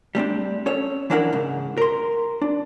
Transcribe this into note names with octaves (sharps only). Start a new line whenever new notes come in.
G3 A3 C4 D4
C#4 A4 C#5
E3 C#4 D4 E4 A#4 F#5
G#2 C#3
A#4 C6
D4